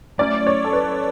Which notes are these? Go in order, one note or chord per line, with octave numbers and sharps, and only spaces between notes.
F#3 A3 C#4 E4 D5
C#5
A4
B4